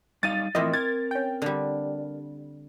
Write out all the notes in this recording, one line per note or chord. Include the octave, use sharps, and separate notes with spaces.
G3 D#4 F5 A6 D#7
A2 E3 F3 A#3 C4 E4 D#5 E5
A#4 G#6 A6
C#4 G5
D3 G3